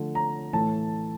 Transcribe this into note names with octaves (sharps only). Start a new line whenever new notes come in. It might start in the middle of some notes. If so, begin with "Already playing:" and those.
Already playing: D3 F3 A3
A#5
A2 E3 A3 A5